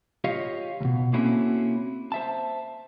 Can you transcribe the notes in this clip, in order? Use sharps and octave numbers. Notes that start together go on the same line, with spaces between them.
F4 G4 C#5 D#5 F5
D2 B2
A#3 C4 C#4 E4 F#4 A4
C5 E5 A5